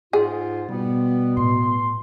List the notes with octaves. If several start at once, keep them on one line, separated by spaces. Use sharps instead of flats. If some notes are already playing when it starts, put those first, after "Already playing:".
G#2 F4 G#4
B2 G3 B3
A2 C6